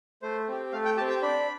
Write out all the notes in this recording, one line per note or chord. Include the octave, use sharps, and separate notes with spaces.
A3 C5
C4 G4
A3 F5
G5
C4 G4 A5
G5
D4 B5